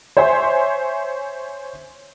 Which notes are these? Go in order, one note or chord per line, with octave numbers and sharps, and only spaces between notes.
C5 C#5 E5 G#5 C6